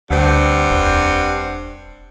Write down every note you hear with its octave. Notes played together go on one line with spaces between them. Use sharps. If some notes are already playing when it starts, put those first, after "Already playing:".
D2 G2 C4 F#5
E1